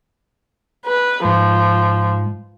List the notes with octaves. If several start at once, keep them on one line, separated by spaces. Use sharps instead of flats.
B4
G#2 F3